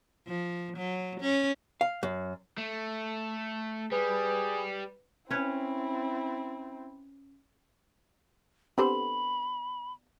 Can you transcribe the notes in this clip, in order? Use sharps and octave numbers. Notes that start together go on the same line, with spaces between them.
F3
F#3
C#4
F5
F#2
A3
G3 G#4 B4
C4 C#4 E4 B4 C#5
D3 B3 C4 G4 A4 C5 B5